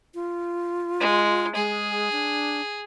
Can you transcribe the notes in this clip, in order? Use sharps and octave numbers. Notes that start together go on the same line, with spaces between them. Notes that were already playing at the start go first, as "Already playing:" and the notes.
F4
G#3
G#3 G#4
D4